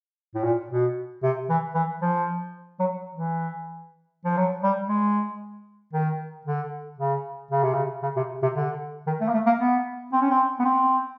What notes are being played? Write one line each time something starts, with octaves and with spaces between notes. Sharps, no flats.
A2
A#2
B2
C3
E3
E3
F3
F#3
E3
F3
F#3
G3
G#3
D#3
D3
C#3
C#3
C3
C#3
C#3
C3
C3
D3
D#3
A3
A#3
A3
A#3
B3
C4
C#4
C4
B3
C4